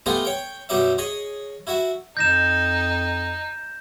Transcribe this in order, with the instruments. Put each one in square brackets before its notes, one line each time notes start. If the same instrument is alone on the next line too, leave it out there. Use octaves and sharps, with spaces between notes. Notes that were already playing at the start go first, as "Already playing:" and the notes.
[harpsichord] A3 B3 F4 G4 D#5 G#5
C#5 G5
F#2 B2 D#4 D5 E5
G#4 C#5 D#5
E4 F#4 E5
[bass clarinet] F2 [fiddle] D#4 [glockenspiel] G6 A#6 E7